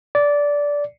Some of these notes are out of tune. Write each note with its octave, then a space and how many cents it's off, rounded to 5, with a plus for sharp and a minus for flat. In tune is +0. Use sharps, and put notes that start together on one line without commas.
D5 -15